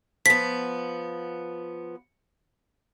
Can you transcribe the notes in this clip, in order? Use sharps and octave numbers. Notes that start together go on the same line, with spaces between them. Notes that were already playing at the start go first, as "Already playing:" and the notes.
F3 B3 B6